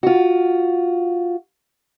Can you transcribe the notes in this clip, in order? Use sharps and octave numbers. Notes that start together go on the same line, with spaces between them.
F4 F#4